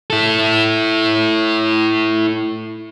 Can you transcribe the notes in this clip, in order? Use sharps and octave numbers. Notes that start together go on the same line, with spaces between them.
E4 A4